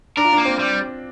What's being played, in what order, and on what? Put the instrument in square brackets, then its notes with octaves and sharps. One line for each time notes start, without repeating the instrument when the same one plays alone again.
[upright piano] D4 [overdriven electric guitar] A#4
[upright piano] F4
D4
[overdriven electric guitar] A#3
[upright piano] C4
[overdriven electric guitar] G3